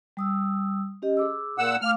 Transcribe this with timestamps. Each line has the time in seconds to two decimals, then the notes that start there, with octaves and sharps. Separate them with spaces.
0.17 G3 D#6 E6
1.02 C#4 G4 D#5
1.17 G#4 D6 E6
1.58 A#2 F#5 E6
1.81 A3 F5 D6 F6